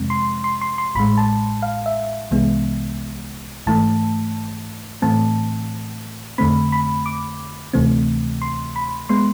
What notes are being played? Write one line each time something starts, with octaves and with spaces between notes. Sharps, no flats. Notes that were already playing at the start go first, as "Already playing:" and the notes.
Already playing: F2 C3 F3 G#3 C4
C6
C6
C6
C6
A1 A2 G#3 B5
A5
F5
E5
C2 C3 E3 G#3 B3
G#1 G#2 E3 A3 A5
A2 E3 A3 C4 A5
F2 D3 A3 C4 B5
B5
D6
D2 C3 E3 A3 C4
C6
B5
G#3 B3 C6